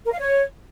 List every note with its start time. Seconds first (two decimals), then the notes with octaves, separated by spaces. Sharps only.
0.05 A#4
0.12 F5
0.19 C#5